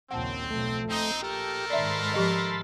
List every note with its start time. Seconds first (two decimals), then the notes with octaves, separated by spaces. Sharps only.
0.11 A#1 D#2 C#3 C4 F#5 A5
0.51 B1 F3 A3
0.89 A#1 C4 D#4
1.22 A3 G4 A4 A#4
1.70 G#2 D#3 D5 E5 B5 C6 A6
2.14 F3 G4 D#5